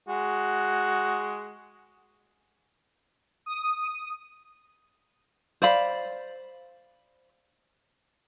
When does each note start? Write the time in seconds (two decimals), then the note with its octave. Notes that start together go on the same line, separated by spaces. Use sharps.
0.09 G#3 F#4 G#4
3.46 D#6
5.62 C5 D5 F5 B5